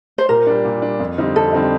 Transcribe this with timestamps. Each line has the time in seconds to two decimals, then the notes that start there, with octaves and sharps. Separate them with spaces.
0.18 C5
0.29 A#2 A#4
0.47 G3 D4
0.65 A#2
0.82 G3 D4
0.99 F2
1.18 D3 G3 C4 D#4
1.35 F2 A4
1.53 D3 G3 C4 D#4